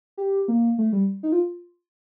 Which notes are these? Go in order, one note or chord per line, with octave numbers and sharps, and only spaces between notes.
G4
A#3
A3
G3
D#4
F4